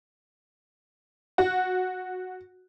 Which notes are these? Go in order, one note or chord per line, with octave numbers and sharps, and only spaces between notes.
F#4